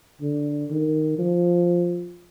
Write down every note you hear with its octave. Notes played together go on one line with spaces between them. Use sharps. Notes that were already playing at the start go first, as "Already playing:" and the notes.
D3
D#3
F3